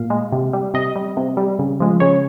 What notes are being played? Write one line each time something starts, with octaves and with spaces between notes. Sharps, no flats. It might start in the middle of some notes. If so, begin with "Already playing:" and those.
Already playing: A#2 F5
G#3
C3
G3
C3 D#5
G3
C3
G3
C#3
F3 G#3
C#3 C#5